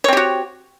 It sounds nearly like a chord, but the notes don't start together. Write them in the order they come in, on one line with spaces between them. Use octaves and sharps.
C#5 C4 G4 F#4